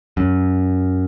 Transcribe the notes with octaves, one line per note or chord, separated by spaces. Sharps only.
F#2